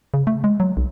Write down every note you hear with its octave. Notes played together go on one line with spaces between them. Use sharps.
C#3
A3
G#3
F#3
B1